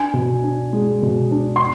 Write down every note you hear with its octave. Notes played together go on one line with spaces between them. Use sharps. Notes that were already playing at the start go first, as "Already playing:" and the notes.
Already playing: D4 G#5
B2
D4
G#3
B2
D4
C6